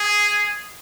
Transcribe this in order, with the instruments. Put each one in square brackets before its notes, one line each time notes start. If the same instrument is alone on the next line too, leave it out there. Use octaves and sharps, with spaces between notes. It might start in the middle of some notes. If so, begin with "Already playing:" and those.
Already playing: [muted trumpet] G#4